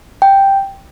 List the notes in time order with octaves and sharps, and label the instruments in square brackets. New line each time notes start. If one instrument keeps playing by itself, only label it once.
[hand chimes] G5